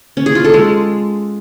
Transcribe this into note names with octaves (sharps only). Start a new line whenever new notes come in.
C#4
G#4
F4
A4
G#3